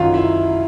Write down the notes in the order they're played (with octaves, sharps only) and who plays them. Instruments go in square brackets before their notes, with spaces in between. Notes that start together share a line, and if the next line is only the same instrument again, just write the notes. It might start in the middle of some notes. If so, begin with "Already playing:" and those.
Already playing: [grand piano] F#2 D#3 F#3 F4 F5
E4 E5